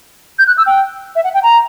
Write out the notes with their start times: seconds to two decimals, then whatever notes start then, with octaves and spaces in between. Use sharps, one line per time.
0.39 G6
0.47 F#6
0.58 E6
0.66 G5
1.16 E5
1.24 F#5
1.34 G5
1.43 A#5